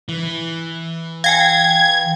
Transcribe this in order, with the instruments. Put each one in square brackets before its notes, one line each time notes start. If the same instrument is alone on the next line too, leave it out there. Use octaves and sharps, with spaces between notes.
[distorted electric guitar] E3
[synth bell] F5 G5 G#5 [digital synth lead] G#6